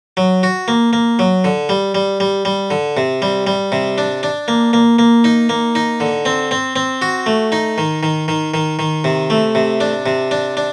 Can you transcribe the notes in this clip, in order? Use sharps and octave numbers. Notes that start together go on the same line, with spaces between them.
F#3
F#4
A#3
A#3
F#3
D3
G3
G3
G3
G3
D3
C3
G3
G3
C3
D4
D4
A#3
A#3
A#3
D#4
A#3
D#4
D3
C4
C4
C4
F#4
A3
D#4
D#3
D#3
D#3
D#3
D#3
C3
A3
C3
D4
C3
D4
D4